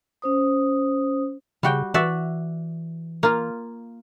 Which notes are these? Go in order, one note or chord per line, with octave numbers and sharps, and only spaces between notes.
C#4 C5 D#6
C#3 G3 F#4 G5
E3 F#4 D5 E5
A#3 F4